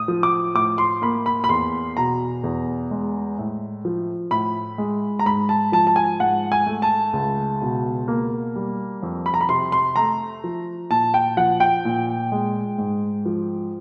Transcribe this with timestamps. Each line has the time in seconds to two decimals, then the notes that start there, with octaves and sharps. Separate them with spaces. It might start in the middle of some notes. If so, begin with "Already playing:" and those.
Already playing: A2 D#6
0.08 F3
0.23 D6
0.55 A2 D6
0.78 C6
1.02 A#3 B5
1.26 B5
1.44 B5
1.49 E2 C6
1.96 B2 A#5
2.44 E2
2.91 G#3
3.38 A2
3.85 F3
4.31 A2 B5
4.78 G#3
5.19 A#5
5.26 G#2 B5
5.49 A5
5.72 F3 A5
5.87 A5
5.96 G#5
6.20 G#2 F#5
6.52 G#5
6.66 A3
6.82 A5
7.13 C#2
7.62 B2
8.08 A#3
8.56 G3
9.03 F2
9.26 B5
9.34 A#5
9.41 B5
9.49 C3 C6
9.72 C6
9.96 A3 A#5
10.44 F3
10.90 A#2 A5
11.14 G5
11.37 F3 F#5
11.60 G5
11.85 A#2
12.32 G#3
12.78 G#2
13.25 F3